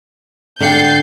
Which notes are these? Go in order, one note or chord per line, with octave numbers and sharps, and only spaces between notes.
D3 F#5 G5 G6 A6 C7